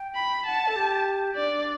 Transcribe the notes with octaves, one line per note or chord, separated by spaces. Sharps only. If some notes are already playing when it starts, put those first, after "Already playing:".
Already playing: G5
B5
F#5 A5
A4
G4
D4 D5